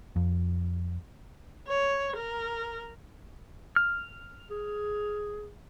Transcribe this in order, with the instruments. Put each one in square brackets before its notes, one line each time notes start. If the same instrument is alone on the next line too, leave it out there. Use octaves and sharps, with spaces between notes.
[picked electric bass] F2
[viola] C#5
A#4
[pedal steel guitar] F6
[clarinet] G#4